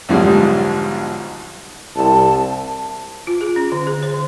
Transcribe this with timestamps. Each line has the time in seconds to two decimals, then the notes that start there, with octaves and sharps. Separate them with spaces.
0.09 B1 G#2 D3 F3 G3 G#3
1.96 C2 A5
3.27 F4
3.41 G#4
3.56 C#4
3.72 D3
3.87 G#4
4.03 C5
4.14 D3